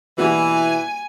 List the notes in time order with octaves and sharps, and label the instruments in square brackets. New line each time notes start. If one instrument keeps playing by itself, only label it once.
[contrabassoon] B2 [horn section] E3 [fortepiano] G3 A#3 F#4 [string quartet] G#5